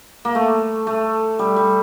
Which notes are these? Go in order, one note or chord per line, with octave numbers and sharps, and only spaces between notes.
A#3
A3
A3
G3
G3